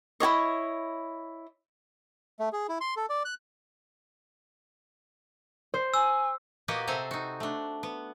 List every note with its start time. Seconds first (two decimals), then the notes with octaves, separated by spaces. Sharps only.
0.20 E4 F#4 C#5 D#5
2.40 A3
2.53 G#4
2.69 E4
2.81 C6
2.97 A4
3.09 D5
3.25 F#6
5.74 C5
5.94 G#5 E6
6.68 A#2 A#3 B3 F#4 G4 D#5
6.87 C3 C4 A4 C5 G#5 A#5
7.11 D#4 F#4
7.40 A3 D4
7.83 B3